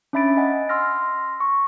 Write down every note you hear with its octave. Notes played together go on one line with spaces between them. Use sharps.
C#4 D4 E5 B5 A6 D7
D#5 F#5 G#5
C6 E6 F6 A#6
C#6